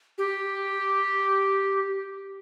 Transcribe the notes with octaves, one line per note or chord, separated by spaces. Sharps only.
G4